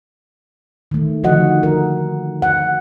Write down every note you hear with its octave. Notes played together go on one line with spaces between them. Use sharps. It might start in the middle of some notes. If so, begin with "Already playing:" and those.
D#3 A3
D3 D#3 F3 F#4 D#5 F#5
A#4
F#5